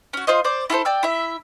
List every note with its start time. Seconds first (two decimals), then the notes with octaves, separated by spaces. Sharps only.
0.13 C#4 F#4
0.27 F4 C5 D#5
0.45 C5 D5
0.70 E4 F4 A4 C5
0.85 D5 G5 E6
1.03 E4 E5